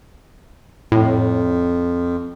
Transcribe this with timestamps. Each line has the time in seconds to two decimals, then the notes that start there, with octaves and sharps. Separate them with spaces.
0.92 F2 A2